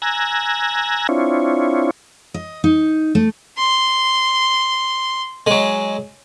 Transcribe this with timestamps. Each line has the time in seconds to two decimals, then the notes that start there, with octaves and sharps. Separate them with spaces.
0.02 G#5 A#5 E6 F#6 G#6 A#6
1.09 C4 D4 E4 F4 C#5
2.34 D#5
2.64 D#4
3.15 A3
3.58 C6
5.47 F#3 G#3